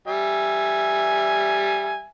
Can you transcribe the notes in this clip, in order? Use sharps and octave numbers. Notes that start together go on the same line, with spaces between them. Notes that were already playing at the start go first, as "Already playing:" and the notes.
G3 E5 G#5